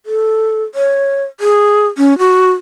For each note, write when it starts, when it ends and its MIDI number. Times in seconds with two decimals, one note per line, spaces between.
0.06 0.64 69
0.75 1.23 73
1.40 1.87 68
1.98 2.17 61
2.19 2.52 66